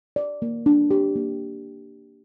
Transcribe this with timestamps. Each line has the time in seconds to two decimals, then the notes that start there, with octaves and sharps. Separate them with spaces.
0.16 D5
0.42 A#3
0.66 D4
0.91 G4
1.15 A#3